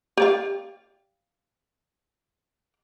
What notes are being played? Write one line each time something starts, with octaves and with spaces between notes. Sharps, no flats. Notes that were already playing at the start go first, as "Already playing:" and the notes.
G4 D5 F5